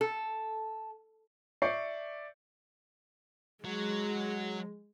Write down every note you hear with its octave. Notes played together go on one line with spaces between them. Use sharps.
A4
D5 E5 C#6 G6 C7 C#7
F#3 G#3